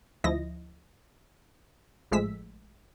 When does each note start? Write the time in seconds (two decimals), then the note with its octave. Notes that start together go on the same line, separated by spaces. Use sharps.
0.24 D2 F3 E4 D#5 A#6
2.11 A1 F3 G#3 A3 E6 B6